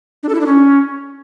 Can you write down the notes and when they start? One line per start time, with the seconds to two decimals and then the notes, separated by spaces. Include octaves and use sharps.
0.23 D4
0.29 A4
0.35 E4
0.40 D4
0.46 C#4